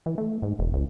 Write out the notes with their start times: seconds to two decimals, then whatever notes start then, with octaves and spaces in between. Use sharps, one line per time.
0.06 E3
0.18 A3
0.42 G#2
0.59 E1
0.73 C#2